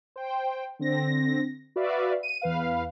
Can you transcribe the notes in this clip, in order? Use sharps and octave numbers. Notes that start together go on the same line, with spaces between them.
C5 G5
D3 C4 A#6
F#4 B4 D5 E5 F5
D#7
E2 B4 F5